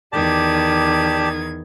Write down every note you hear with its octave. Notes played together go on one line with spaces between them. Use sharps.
E2 D#3 G4 D5 A5 G#6